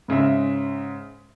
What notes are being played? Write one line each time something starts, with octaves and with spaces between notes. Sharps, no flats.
G#2 C#3 G#3 E5